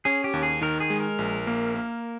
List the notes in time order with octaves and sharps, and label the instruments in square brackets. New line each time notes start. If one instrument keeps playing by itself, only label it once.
[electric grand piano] C#4 [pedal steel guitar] G#4
[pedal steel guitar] G4
[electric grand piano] D#2
[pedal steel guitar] G#4
[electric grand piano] D#3 [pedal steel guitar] A#4
[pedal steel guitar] G#4
[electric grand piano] G#3
[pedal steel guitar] A#4
[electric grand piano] A#1
A#3
A#3